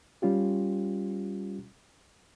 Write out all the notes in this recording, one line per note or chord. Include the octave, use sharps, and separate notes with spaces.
G3 C#4 F4 G4